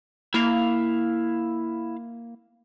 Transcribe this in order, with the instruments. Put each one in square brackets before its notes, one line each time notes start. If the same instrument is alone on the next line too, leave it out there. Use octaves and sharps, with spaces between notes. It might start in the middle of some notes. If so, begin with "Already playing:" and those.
[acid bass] A#3 [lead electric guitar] E4 F5